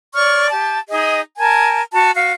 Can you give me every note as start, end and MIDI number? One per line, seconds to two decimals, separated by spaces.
0.14 0.48 73
0.14 0.48 74
0.14 0.48 85
0.14 0.48 89
0.50 0.78 67
0.50 0.78 81
0.89 1.21 63
0.89 1.21 68
0.89 1.21 75
1.38 1.81 70
1.38 1.81 80
1.38 1.81 81
1.93 2.12 66
1.93 2.12 81
2.14 2.33 66
2.14 2.33 77